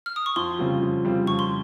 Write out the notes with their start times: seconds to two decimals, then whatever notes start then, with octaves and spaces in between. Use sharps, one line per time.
0.06 F6
0.16 D#6
0.26 C#6
0.36 F2 C6
0.59 C#3 G3 C4 F4
0.82 F2
1.05 C#3 G3 C4 F4
1.27 F2 C#6
1.39 C6